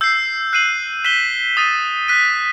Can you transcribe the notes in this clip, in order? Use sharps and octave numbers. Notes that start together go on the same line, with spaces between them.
E6 G6 C7
F#6 C7 D#7 F#7
F#6 B6 E7 G7
D#6 A6 D#7
F#6 B6 D#7